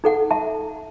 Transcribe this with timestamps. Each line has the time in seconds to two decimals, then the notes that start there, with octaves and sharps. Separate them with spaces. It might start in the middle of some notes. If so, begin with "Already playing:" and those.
0.04 D#4 A4 F#5
0.31 E5 A5